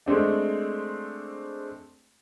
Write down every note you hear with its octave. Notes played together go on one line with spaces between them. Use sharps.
G#3 A3 C4 D4